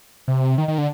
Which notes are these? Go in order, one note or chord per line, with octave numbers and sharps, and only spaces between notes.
C3
D#3
D#3
D3